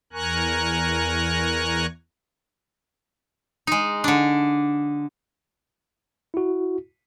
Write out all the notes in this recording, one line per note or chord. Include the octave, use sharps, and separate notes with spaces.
E2 A#4 G#5 A#5 C#6 F#6
G#3 D#4
D3 D4
E4 F#4